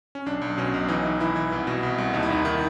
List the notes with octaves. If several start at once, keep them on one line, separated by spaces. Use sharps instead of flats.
C#4
B1 D4
B1
B2 C#4
B1
E3 D#4
E3
E3 E4
E3
C2
B2
C2
C2
D#2 D#4
E4
D#2 D#4
D#3